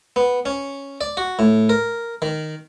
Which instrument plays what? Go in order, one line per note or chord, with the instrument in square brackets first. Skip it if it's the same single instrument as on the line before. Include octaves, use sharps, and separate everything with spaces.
[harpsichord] B3
C#4
D5
F#4
A2
A#4
D#3